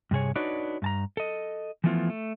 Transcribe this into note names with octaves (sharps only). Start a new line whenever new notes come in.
G2 C3 G#4 C#5
D4 D#4 F#4 B4 C#5 D5
G2 A5 A#5
A4 D#5
E3 F3 A3 B3 E4 F4
A3